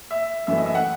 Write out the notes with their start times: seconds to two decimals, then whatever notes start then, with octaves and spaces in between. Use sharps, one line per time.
0.11 E5
0.47 F#2 E3 A3 E5
0.57 D#5
0.66 E5
0.75 F#5